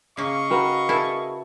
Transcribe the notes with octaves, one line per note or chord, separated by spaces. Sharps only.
C#3 A#3 D#5 F5 C#6
F#4 A#4 B4 G5 A#5
E4 G#4 A#4 A5